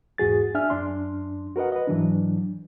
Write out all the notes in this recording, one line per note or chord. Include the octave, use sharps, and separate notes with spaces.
E2 G#2 F#4 G#4 A6
D4 E5 G#5 F6
F#2 D4 C6
F#4 A#4 B4 D#5 F#5
B4 D#5
G#2 E3 F#3 D4